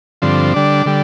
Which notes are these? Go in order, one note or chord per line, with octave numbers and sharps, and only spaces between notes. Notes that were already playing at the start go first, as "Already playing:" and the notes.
G2 D3 F3 C4
D3 G3 D4
D3 G3